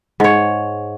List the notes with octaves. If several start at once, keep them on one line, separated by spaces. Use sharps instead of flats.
G#2 C#5